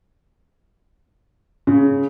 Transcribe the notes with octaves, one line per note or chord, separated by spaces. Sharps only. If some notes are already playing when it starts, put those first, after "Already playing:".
C#3